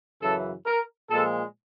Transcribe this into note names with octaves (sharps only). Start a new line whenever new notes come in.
F#2 C#3 E3 A4
A#4
A#2 F3 G#3 A4